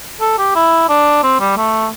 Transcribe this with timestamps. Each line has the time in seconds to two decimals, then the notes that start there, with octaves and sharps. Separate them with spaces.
0.21 A4
0.38 G4
0.55 E4
0.89 D4
1.23 C4
1.40 G3
1.57 A3